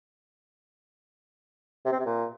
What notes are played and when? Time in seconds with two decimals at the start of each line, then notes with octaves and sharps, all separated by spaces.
1.85 C3
1.92 C4
1.99 C3
2.06 A#2